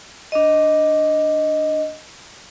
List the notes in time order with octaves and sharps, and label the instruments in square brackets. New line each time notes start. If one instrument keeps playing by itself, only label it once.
[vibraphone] D4 D#5